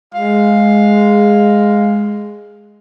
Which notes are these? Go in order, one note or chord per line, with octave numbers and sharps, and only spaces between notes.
G#3 F5